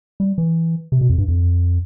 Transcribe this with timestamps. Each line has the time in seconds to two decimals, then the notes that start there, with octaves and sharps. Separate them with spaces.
0.20 G3
0.38 E3
0.92 C3
1.01 B2
1.10 F2
1.18 G2
1.28 F2